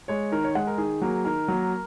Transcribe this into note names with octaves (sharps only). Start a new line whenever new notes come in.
G#3 C#5
D#3 A#4
C#5
G#3 F#5
A#4
D#3 G#4
F#3 A#3
D#3 A#4
F#3 A#3